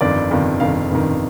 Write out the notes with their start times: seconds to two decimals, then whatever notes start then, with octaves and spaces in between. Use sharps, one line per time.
0.01 G1 F2 D#3 D5
0.31 G1 F2 D#3
0.60 G1 F2 D#3 F5
0.90 G1 F2 D#3